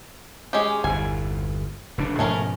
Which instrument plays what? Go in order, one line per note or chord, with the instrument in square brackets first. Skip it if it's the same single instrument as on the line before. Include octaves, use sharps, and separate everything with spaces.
[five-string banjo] G#3 C#4 G4
[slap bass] G1 E2 [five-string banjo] G#5
[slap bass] F1 C#3 D4
[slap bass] G#2 B2 F3 [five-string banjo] A3 C#4 A#4